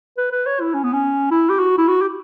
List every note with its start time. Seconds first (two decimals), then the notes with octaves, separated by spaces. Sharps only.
0.18 B4
0.32 B4
0.46 C#5
0.60 E4
0.74 C#4
0.84 B3
0.93 C#4
1.31 E4
1.49 G4
1.59 F#4
1.78 E4
1.88 F#4
2.01 G4